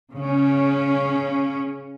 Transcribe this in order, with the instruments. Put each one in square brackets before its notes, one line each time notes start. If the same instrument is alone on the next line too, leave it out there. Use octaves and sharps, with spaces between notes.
[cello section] C#3 C#4